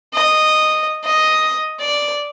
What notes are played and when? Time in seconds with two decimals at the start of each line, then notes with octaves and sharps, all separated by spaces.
0.14 D#5
1.04 D#5
1.80 D5